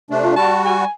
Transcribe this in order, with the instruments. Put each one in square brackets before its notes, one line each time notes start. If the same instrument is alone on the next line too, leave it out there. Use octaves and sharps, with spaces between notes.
[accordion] C3 A3 D4
[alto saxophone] F4
[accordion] G3 F#4 [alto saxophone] A5
[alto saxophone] G#5